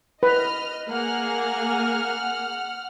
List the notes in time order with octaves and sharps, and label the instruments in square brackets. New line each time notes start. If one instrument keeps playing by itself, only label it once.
[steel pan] B4 [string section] D#5 F6
[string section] A#3 G#4 [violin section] F#5 F6